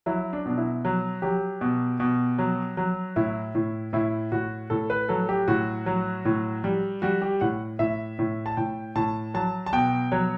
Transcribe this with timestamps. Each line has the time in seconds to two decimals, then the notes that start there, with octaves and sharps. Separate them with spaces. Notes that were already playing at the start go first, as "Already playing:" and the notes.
0.06 F#3 E4
0.33 D4
0.46 B2 D4
0.58 E4
0.85 F#3
1.22 F#3 G4
1.61 B2
2.00 B2
2.38 F#3
2.77 F#3
3.16 A2 E4
3.55 A2
3.93 A2 E4
4.32 A2 F#4
4.70 A2 A4
4.90 B4
5.09 F#3 A4
5.29 G4
5.48 A2 F#4
5.86 F#3
6.25 A2
6.64 G3
7.02 G3 F#4
7.22 G4
7.41 A2 F#5
7.79 A2 E5
8.19 A2
8.46 A5
8.57 A2 G5
8.95 A2 A5
9.34 F#3 A5
9.66 A5
9.73 B2 G5
10.12 F#3 C#5